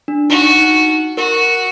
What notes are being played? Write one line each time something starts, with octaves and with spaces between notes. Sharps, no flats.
D4
D#4 F#4
D#4
F#4 A#4